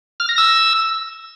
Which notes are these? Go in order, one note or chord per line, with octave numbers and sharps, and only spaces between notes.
F6
A#6
E6